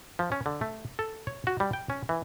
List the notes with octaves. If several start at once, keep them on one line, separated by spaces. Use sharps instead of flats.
F3
C#4
D3
A3
A4
C#5
F#4
G3
G5
C#4
E3